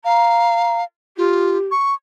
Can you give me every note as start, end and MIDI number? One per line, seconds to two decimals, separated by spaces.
0.05 0.84 77
0.05 0.81 82
1.18 1.58 65
1.18 1.69 67
1.71 1.94 85